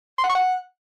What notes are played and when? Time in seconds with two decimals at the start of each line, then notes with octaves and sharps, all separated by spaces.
0.18 C6
0.24 F#5
0.29 C#6
0.35 F#5